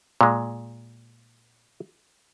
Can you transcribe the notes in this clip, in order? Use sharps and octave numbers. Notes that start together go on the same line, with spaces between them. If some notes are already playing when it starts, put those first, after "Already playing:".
A#2 G#3